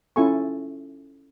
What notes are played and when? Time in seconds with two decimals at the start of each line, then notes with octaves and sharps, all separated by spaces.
0.16 C#4 E4 F4 A4 G#5 C#6